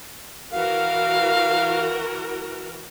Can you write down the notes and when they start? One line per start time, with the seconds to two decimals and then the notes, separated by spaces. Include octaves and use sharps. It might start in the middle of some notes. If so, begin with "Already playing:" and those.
0.53 E3 F#4 A#4 F5